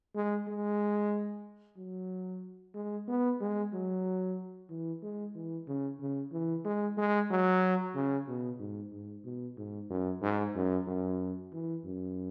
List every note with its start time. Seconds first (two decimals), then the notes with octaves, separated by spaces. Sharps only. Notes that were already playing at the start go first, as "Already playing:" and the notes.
0.15 G#3
0.48 G#3
1.77 F#3
2.75 G#3
3.08 B3
3.41 G#3
3.73 F#3
4.70 E3
5.03 G#3
5.35 E3
5.68 C#3
6.00 C#3
6.32 E3
6.65 G#3
6.98 G#3
7.30 F#3
7.95 C#3
8.28 B2
8.60 G#2
8.93 G#2
9.25 B2
9.58 G#2
9.90 F#2
10.22 G#2
10.55 F#2
10.87 F#2
11.53 E3
11.85 F#2